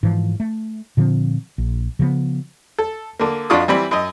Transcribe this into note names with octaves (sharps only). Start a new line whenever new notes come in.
G#2 E3 F3
A3
A#2 D3 F3 C4
A#1
C#3 F3 G3 B3
A4
D3 A#3
F2 D4 F4 F#4 C#6 D#6
E3 G3 C4 B5
F#2 D#5